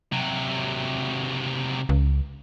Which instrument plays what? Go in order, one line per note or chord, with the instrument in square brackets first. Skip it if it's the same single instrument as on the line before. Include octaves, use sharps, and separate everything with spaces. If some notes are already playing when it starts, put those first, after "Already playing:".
[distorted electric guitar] C3 F#3
[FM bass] C#2